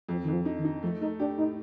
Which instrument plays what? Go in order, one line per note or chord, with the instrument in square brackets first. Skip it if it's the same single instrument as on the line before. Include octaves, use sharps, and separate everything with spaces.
[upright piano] F2 [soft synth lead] F3
[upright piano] F2 [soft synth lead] D#3
[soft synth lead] F3
[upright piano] D#4
[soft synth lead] D#3
[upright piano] D#4
[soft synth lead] F3 [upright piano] A3
[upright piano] A3 [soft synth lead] D#4
[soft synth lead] D4 [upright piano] G4
[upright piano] A2 [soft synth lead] D#4